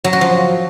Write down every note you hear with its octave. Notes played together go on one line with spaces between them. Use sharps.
F#3
F#4
F3